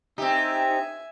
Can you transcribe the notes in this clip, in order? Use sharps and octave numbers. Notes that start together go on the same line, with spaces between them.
C4 D#4 G4 E5 G#5